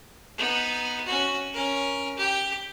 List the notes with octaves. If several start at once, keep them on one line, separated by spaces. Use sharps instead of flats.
B3 D#4
C#4 F#4
C#4 A#4
G4